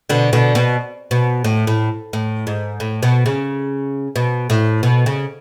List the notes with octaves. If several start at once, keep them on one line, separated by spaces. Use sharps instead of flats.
B2 D3
B2 D3
B2
B2
A2
A2
A2
G#2
A2
B2
C#3
B2
A2
B2
C#3